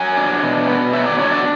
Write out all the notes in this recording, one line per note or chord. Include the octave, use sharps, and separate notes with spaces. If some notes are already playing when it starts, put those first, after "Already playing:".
Already playing: F#3 G#5
D4
B2
B3
F#3 E5
D5
D4 C#5
D5